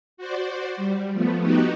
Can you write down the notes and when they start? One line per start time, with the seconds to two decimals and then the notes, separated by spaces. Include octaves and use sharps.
0.17 F#4 C5 D5
0.77 G3
1.12 F3 A3 B3
1.42 B3 D#4 F#4 G4